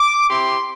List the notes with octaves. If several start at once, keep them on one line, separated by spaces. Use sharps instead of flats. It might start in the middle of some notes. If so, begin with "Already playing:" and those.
Already playing: D6
C4 E4 G4 C6